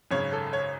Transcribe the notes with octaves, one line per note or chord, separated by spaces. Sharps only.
G#1 F#2 C#3 C#5
A4
C#5